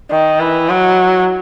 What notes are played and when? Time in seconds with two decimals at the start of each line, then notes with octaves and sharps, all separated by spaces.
0.11 D#3
0.40 E3
0.69 F#3